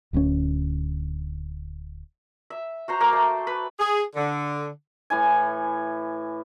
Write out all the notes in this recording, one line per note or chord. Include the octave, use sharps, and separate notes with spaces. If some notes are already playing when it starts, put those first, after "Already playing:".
D1 D2 G#3 C#4
E5
F#4 C5 A#5
A#3 D6
A3
B4
G#4
D3
A2 E3 G#5